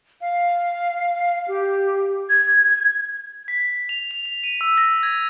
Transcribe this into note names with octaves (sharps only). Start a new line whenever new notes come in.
F5
G4
G#6
B6
F7
F7
F7
D#7
E6
A#6
G#6